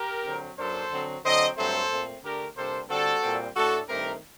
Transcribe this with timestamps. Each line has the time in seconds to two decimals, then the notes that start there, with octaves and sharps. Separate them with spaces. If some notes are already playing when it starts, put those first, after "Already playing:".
Already playing: G4 A#4
0.25 D3 F#3 C4
0.57 F#2 F#3 A#3 D4 A4 C5
0.91 D3 F#3 C4
1.24 D3 F#3 C4 C5 D#5
1.57 G2 F#3 A3 C4 A4 C5
1.90 A#2 A3 C4
2.23 D3 A3 D4 G4 A#4
2.56 C3 G3 A#3 D4 A4 C5
2.89 D3 G3 C4 F#4 A4
3.23 A#2 G3 C4
3.56 A2 A3 D4 F#4 A4
3.88 G2 D#3 A3 C4 G4 A#4